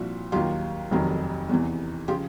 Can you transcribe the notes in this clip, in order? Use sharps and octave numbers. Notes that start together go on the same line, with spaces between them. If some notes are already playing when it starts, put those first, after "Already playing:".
Already playing: C2 A#2 F3 E4 F#4
D#2 D#3 F#3 F4 G4
F1 F2 C3 D#3 F#3
E2 C3 E3
C#3 F3 F4 G4